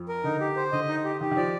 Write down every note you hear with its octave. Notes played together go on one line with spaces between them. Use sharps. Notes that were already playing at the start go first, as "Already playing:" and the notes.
Already playing: F2 F3
A#4
D3 D#4
G4
C5
D3 D#5
D#4
G4
D#3 G4
D#3
F3 D5